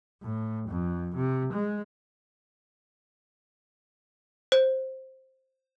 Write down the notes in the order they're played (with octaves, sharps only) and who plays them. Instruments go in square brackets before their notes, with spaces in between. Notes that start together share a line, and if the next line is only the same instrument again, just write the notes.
[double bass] A2
F2
C3
G#3
[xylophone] C5